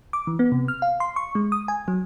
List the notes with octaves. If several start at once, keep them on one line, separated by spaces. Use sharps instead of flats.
D6
E3
B3
C3
F6
F5
C6
C#6
G#3
D#6
G#5
F#3